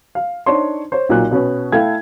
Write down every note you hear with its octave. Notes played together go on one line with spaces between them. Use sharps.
F5
D4 D#4 C5 C#5 C6
C5 C#5
B1 A#2 F#3 F#6
B2 B3 C#4
A3 E4 A4 F5 G5 G#6